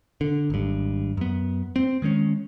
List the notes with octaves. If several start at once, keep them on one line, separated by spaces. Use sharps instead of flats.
D3
G#1 G2
F#2 B3
C4
D#3 G#3 A3 C#4